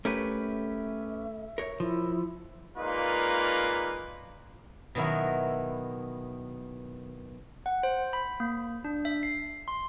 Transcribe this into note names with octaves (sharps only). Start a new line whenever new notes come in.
A3 C#4 G4 A#4 B4
E5
A#4 C#5
F3 E4
G#3 A#3 D#4 F4 B4 D5
B2 D#3 F#3 E4
F#5
C5
B5
A#3
D4
E5
C7
C6